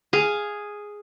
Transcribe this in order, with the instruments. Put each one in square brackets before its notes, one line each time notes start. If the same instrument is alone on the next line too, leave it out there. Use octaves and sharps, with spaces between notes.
[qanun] G#4 F5